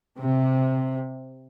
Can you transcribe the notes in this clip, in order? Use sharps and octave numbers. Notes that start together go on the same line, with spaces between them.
C3